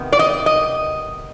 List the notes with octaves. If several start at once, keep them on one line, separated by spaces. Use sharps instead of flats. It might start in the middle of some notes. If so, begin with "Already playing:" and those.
Already playing: C3 D#3 B3
D5
D#5
D#5